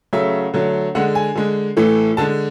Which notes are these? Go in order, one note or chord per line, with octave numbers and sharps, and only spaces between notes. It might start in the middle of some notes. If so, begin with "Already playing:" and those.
C#3 F#3 A3 E5
D3 F#3 A3
D3 G#3 F#5
G#5
D3 G#3
A2 E3 A3
D3 G#3 A5